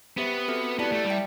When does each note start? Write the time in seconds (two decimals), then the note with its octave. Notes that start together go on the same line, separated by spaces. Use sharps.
0.17 B3 G4 C5 E5
0.48 C4 F#4 A4 E5
0.79 B3 E4 G4 D5 A5
0.92 A3
1.04 G3
1.10 E5 G5